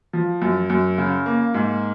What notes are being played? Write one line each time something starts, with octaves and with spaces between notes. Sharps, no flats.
F3
F#2
F#2
C#3
A#3
G#2